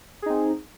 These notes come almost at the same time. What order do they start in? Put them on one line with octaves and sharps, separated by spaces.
G#4 D#4 C4